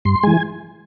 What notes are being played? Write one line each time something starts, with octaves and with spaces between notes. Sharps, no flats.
G2 C6
E3 G#3 G#5